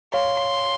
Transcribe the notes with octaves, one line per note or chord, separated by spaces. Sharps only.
C#5 F5 C6